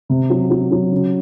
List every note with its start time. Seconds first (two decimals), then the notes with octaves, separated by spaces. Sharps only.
0.09 C3
0.30 F#3
0.50 F#3
0.71 F#3
0.91 C#3